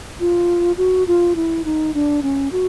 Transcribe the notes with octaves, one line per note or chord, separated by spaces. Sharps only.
F4
F#4
F4
E4
D#4
D4
C#4
F#4